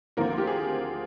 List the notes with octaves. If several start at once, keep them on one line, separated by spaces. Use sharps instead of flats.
D2 D3 F3 A#3 C4 F4 A#4
G4
G#4